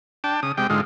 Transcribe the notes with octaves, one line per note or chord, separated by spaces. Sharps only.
D4 G5 A5
C#3 D#6
C3 G#3 G4 G5
G#2 D3 G#3 F4